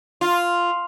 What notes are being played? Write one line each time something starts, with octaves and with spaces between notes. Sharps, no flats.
F4